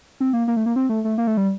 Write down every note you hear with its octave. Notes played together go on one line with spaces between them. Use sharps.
C4
A#3
A#3
A3
A#3
C4
A3
A3
A#3
A3
G3